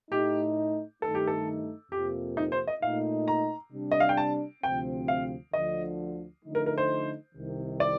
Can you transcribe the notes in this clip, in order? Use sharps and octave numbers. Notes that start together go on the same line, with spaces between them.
A2 A3 D#4 G4
G2 D#3 A3 D#4 A4
G4
A4
F2 C3 F3 A#3 G4
D#4
C5
D#5
A#2 A3 D#4 F5
A#5
C3 G3 D4
D#5
F5
G5
A5
D2 C3 F3 C4 G5
F5
D2 D3 F3 D#5
D3 F3 A3 D#4
A#4
A#4
C5
C2 C3 D#3
D5